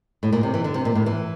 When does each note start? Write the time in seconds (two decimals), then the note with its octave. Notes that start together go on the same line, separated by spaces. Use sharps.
0.23 A2
0.33 A#2
0.43 C3
0.54 E3
0.64 D3
0.74 C3
0.85 A#2
0.95 A2
1.06 E3